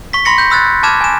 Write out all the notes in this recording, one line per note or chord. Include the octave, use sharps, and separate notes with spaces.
C#6 B6
B5 C6 A#6 C#7
G6
B5 E6 F#6 A6
A5 B5 D6 F6 G#6 E7
G#5 E7